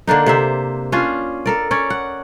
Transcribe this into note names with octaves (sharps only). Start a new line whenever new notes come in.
D3 A#3 D4 D#4
C3 C5 E5
C#4 D4 F4
A4 A#4 D5
C#4 C#5 D5
F#5